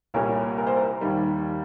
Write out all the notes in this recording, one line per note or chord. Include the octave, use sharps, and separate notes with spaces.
C2 A#2 G3 A#3 A#4 C#5
A#4
C5
A#4
D#2 D#3 G3